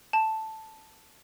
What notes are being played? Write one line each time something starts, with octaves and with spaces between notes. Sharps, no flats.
A5